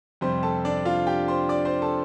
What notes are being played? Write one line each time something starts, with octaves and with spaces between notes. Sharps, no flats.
F2 C3 G3 C5 C6
A4 A5
D4 D5
F4 F5
G4 G5
C5 C6
D5 D6
C5 C6
A4 A5